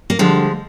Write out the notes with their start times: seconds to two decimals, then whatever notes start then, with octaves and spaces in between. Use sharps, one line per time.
0.10 A#3
0.19 D3 F3 G3 G#3